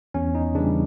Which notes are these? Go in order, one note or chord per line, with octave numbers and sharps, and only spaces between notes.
E2 C#4
D#4
C#3 E3 G3 D4